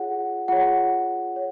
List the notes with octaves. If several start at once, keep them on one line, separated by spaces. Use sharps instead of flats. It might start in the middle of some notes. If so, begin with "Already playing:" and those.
Already playing: F4 G#4 C#5 F#5
F4 G#4 C#5 F#5
C#5